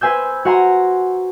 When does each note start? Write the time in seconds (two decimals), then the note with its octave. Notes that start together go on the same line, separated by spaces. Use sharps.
0.01 B4 C5 G#5 E6 G6
0.45 F#4 F#5 G#5 A#5 C6